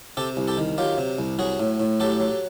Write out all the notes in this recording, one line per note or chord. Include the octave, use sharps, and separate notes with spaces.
C3 G4 A4
C2
G4 A4
D#3
F#3 F4 G4
C3
C2
F#3 F#4 G#4
A2
A2
F#3 G4 A4
F#3